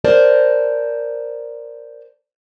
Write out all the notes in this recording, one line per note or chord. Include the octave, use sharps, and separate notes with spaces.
A#4 C5 D5 A5